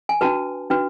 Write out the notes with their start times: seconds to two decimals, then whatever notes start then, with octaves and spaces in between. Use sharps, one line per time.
0.09 G#5
0.21 D4 F#4 B4 A5
0.70 D4 F#4 B4